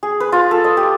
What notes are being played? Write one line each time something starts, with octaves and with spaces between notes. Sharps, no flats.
G#4
B4
F4
A4
D#5
G4